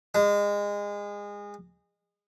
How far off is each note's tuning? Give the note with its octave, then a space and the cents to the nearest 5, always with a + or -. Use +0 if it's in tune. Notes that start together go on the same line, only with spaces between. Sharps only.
G#3 -25